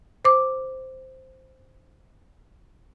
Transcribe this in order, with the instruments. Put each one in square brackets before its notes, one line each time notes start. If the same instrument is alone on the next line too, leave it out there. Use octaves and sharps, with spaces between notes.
[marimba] C5 D6